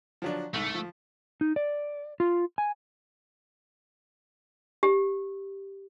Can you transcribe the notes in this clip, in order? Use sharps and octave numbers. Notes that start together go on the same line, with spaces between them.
F3 F#3 D4
C2 G#2 A3
F3
D#4
D5
F4
G#5
G4